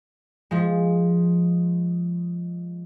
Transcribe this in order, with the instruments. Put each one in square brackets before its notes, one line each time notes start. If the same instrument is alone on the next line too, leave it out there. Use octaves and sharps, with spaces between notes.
[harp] F3 G#3